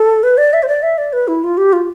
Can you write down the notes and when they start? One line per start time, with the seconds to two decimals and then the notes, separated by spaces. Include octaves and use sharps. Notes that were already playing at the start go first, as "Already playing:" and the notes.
Already playing: A4
0.23 B4
0.38 D5
0.53 E5
0.63 C5
0.68 D5
0.83 E5
0.98 D5
1.13 B4
1.28 E4
1.44 F4
1.57 G4
1.73 F4